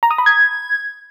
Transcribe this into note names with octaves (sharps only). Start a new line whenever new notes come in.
A#5
D#6
B5
G#6